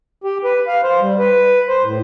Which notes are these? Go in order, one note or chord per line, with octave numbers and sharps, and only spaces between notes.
G4
B4
F5
C5
G3
B4
C5
A2